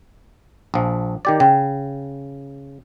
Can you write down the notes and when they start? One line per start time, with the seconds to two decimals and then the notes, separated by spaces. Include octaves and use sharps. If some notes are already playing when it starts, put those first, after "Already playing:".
0.74 A#1 F3
1.25 D#3 G4 D5
1.40 C#3 G5